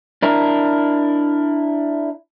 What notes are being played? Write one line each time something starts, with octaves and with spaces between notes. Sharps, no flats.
D4 E4 A#4